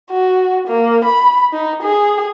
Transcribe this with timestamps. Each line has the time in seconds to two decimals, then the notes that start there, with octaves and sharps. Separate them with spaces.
0.11 F#4
0.68 A#3
1.05 B5
1.53 D#4
1.83 G#4